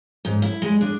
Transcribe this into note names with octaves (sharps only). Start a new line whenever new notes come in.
G#2
E4
G#3
D4